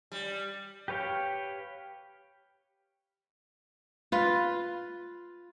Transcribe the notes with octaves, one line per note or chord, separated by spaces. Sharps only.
G3
G4 B4 C#5 F5 G5
F4 B4